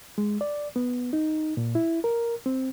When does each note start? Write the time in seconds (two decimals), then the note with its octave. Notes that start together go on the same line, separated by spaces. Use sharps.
0.18 G#3
0.41 D5
0.76 B3
1.13 D#4
1.57 A#2
1.75 E4
2.04 A#4
2.46 C4